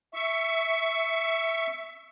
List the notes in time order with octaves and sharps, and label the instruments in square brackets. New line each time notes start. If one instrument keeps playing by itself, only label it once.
[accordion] E5 C#6